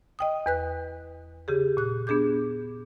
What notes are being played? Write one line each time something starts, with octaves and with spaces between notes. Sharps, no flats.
D#5 G5 D#6
E2 B4 F#6
C#3 G4 G#4
A#2 F#6
B3 D4 G#4 D6 G6